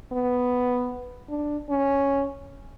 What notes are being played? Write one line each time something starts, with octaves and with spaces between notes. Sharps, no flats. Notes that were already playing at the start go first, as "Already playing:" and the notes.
B3
D4
C#4